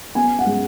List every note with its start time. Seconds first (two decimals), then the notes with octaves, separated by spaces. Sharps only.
0.15 B3 G#5
0.39 F#5
0.46 G#3